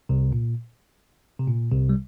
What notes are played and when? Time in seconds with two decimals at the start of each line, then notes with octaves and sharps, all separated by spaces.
0.09 C2 C3
0.33 A#2
1.40 C3
1.48 A#2
1.71 C2 C3
1.89 G3